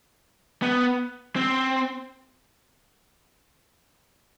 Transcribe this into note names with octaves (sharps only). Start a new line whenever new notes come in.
B3
C4